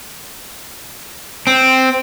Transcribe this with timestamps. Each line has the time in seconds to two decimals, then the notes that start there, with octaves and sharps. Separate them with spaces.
1.47 C4